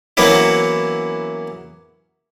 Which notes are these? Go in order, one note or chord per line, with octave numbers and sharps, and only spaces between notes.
E3 F#3 A#3 B3 C#4 E4